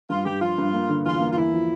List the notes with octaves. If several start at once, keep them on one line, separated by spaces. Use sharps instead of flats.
G2 F4
G2 G4
F3 F4
G2
A#3
D3
E2 F4
A#3
F4
E2 E4
F3